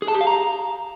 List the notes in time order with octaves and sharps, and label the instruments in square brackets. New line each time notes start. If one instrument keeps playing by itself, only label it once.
[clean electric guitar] G#4
A5
G4
F5
A#5